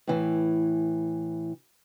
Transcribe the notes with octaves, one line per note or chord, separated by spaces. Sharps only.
A2 E3